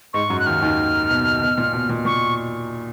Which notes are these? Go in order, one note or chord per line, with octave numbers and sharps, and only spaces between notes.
G#2 G#3 C#6
F#2 F#3
F#6
D#2 D#3 F6
D#2 D#3
B2
B2
A#2
B2
A#2
A#2 C#6